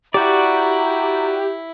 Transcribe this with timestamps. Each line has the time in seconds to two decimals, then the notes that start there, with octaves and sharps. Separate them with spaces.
0.14 E4 F#4 G4 D5 A#5